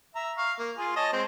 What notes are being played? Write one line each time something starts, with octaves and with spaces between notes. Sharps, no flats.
E5 A#5
F5 C#6
A#3
F4 G#4
C#5 D#5 A5
G#3 C4 C5